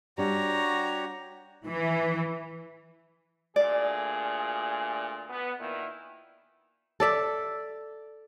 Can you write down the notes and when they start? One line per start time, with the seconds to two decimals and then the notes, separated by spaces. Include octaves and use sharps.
0.18 G3 D4 F#4 G4 C#5 A#5
1.66 E3
3.56 D2 A#2 G#4 D5
5.30 B3
5.60 A#2 D#3 E4
7.00 A4 D5 E5